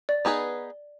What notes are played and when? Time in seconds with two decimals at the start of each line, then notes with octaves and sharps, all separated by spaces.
0.09 D5
0.25 B3 D#4 G#4 B4